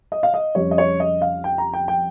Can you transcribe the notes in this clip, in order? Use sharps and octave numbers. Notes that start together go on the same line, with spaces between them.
D#5
F5
D#5
F2 C#3 G3 C#5
D#5
C#5
D#5
F5
G5
A#5
G5
G5